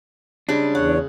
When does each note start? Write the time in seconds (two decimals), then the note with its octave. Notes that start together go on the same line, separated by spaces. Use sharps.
0.49 C#3 G3 G#3 D4
0.75 E2 C#5 F#5